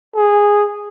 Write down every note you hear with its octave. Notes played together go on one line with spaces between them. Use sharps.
G#4